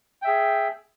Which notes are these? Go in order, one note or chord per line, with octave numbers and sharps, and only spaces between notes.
G#4 E5 G5